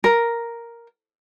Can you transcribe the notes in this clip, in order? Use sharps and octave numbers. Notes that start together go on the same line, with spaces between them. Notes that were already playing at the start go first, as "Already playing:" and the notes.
A#4